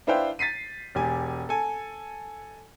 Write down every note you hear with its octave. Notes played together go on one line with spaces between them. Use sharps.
D4 E4 B4 C5 F5 G5
A6 B6 C7 D#7
E1 G4 G#5
A4 G#5